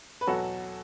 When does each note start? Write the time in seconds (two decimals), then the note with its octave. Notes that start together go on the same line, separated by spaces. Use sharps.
0.21 B4
0.27 E2 B2 F#3 F#4 A4